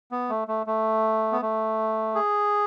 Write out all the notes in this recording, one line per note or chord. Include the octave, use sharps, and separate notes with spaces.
B3
A3
A3
A3
B3
A3
G#4